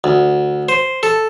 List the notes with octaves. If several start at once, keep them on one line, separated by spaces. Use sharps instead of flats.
D2
C5
A4